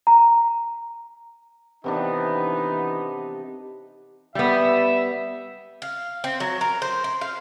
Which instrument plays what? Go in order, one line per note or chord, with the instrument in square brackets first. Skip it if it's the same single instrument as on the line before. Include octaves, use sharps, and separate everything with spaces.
[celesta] A#5
[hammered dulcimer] C3 D#3 D4 [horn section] E3 B3 D#4
[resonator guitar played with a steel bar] G3 B3 [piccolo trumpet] E5
[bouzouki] F5
C4
F#3
A#4
C5
C5
F5